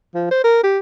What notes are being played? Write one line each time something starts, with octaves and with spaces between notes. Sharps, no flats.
F3
C5
A#4
G4